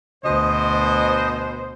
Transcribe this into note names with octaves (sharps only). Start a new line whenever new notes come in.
D2 B2 C5 D#5